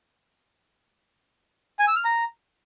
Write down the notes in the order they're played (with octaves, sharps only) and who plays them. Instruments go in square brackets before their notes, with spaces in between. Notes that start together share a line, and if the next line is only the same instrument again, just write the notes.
[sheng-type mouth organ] G#5
E6
F6
A#5